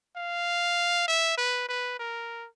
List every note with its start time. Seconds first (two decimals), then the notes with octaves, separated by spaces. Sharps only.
0.16 F5
1.08 E5
1.37 B4
1.68 B4
1.99 A#4